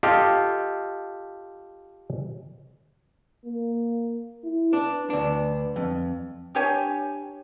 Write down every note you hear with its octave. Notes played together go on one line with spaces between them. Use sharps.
F4 G4 A4 D#5
A#3
E4
D4 B4
D2 D4
F2
D4 G4 C#5 G#5